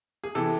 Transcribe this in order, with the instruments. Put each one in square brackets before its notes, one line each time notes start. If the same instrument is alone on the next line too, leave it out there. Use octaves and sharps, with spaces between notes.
[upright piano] G#4
C3 E3 A4